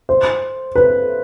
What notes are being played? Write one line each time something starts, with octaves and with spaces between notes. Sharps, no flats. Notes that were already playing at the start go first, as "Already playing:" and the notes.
C5
B4